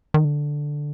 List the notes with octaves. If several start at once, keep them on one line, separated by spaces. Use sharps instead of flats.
D#3
D3